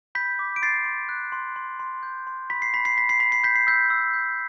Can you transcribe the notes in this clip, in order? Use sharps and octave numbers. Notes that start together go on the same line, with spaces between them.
B5 G6 B6
D6
D7
C6 A6 C7
C6
F#6
C6
C6
C6
G6
C6
B5 B6
C7
B5 B6
C7
B5 B6
C7
B5 B6
C7
G6 B6
C7
E6 G6 B6
E6
G6